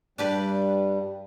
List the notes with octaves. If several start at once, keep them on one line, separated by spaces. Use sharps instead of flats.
G2 G3 D4 G4 B4